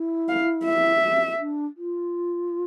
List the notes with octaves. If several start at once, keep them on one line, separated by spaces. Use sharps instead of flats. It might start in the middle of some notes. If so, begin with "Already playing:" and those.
Already playing: E4
F5
E5
D4
F4